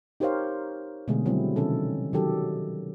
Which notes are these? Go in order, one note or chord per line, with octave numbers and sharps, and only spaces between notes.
D#4 G4 A#4 C5 C#5 F5
B2 D3 G#3 A3 G#4
D#3 F#3 G3 C4 E4
C3 D#3 C#4 A4
D#3 F#3 G4 A4